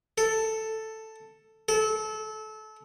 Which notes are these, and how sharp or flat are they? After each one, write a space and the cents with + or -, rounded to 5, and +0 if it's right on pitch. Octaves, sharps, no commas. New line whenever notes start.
A4 +5
A4 -25